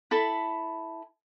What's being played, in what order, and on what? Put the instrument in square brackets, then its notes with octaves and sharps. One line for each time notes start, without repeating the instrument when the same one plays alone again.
[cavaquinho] E4 A4 A5 B5